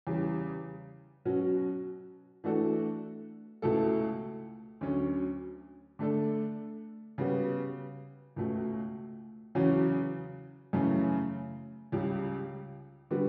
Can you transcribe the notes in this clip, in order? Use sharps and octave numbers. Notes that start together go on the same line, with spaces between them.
E2 C#3 G3
B2 F#3 C#4 F#4
E3 A3 D4 F#4 A4
C#2 B2 A3 E4 A4
D2 D3 F#3 C#4
D3 A3 D4 A4
C#3 G3 B3 F#4
C#2 B2 A3
E2 C#3 F#3 C#4 F#4
F#2 C#3 E3 A3 C#4
C#2 C#3 G3
D3 G3 B3 F#4